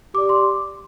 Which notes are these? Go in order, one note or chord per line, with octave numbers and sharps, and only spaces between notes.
G4 D5 D6
C6